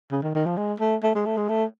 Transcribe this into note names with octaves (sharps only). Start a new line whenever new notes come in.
C#3
D#3
D#3
F3
G#3
A3
A3
G#3
A3
G#3
A3